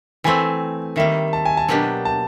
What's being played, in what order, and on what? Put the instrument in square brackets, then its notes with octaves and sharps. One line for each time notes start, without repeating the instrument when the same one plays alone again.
[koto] E3 A3 C4 [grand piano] G#5
[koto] D#3 G3 A#3 [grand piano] E5
[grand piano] A5
G#5
A5
[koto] B2 F#3 A#3 D4 G4
[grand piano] A5